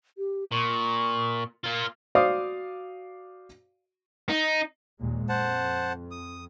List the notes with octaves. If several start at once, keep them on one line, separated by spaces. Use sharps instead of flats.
G4
A#2 C#6
A#3 F4
F#4 C5 D5 F5 D6 D#6
D#4
D#2 A#2 G#3
F2 C5 F#5 A5
D#6